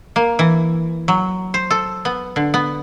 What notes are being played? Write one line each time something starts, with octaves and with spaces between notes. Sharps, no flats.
A#3
E3
F#3
C5
A4
B3
D3
B3